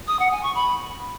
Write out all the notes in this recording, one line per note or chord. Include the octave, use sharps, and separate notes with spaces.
D#6
F#5
G#5
C#6
B5